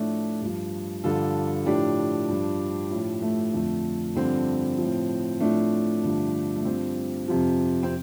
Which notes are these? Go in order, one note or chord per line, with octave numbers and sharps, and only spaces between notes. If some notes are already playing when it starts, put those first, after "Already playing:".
Already playing: A2 F3 A3 D4
G2 F3
G2 D3 F3 F4 A4
A2 F3 D4 G4
G2 F3
A2 F3
A3
F2 D3 F3 A3
G2 D3 F3 C4
A2 F3
A2 F3 A3 D4
G2 D3 F3
A3
G2 F3 C4
F2 C3 F3
C4